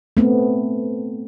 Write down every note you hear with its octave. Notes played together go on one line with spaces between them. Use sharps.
A3 B3 C4